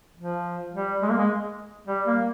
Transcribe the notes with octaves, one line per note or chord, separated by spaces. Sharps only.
F3
G3
G#3
A#3
G#3
G3
A#3